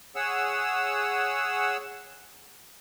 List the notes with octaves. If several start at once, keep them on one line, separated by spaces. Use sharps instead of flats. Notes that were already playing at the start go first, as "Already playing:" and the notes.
G#4 C#5 F#5 E6